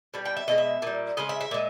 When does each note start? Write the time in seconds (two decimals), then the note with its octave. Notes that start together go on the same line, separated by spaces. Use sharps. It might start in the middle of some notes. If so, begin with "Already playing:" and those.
0.14 B2 G3
0.25 G5
0.37 E5
0.48 B2 G#3 D#5
0.58 E5
0.82 A#2 G3
1.17 C#3 G#3 D#5
1.29 E5
1.41 E5
1.51 A#2 G#3